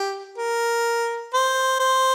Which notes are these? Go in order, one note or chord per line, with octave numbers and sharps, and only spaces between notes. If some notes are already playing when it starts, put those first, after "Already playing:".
Already playing: G4
A#4
C5
C5